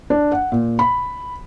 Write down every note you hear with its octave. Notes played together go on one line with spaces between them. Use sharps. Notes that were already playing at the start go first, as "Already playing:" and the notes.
D4
F#5
A#2
B5